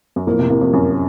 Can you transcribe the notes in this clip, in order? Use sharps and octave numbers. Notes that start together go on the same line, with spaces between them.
F#2
F2 A2 A#3
A2 C3
A2 C3 A#3
F2 A2
F#2 C#4